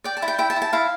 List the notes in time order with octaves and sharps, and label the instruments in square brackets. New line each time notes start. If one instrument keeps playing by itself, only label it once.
[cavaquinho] D5 G5
A5
E4
G5
E4 G5
A5
E4
A5
E4 F5